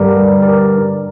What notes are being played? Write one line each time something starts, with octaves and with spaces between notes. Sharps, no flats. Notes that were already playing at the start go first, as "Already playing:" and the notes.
Already playing: G2 D3 G3 G4 A#4
A#4 D5